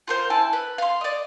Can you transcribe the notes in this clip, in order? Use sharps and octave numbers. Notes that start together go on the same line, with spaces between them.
F4 A#4 C5
E4 G#5 A5
B4
F5 C6
D5 D#5